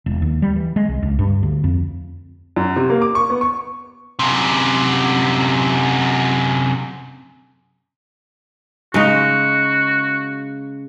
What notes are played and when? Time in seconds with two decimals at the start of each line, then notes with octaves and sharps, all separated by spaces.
0.06 E1
0.22 D#2
0.42 G3
0.56 E3
0.76 G#3
0.88 C2
1.03 C#2
1.19 G2
1.43 D2
1.64 F2
2.56 F#2
2.76 C3
2.90 A#3
3.02 D6
3.15 C#6
3.30 B3
3.41 C#6
4.19 F#2 C3
8.94 C#3 G#3 D#4 F#4